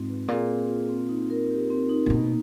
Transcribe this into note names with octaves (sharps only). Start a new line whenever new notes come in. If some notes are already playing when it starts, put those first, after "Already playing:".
Already playing: G#2 C4 F4
B4
A#2 G#4
C4
F4
C4
D#4
A#4
G4
C4
D#4
A#2
B2 A#3